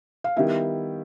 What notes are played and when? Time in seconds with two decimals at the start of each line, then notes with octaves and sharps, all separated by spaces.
0.24 F5
0.37 D#3 G3 B3 E4 E5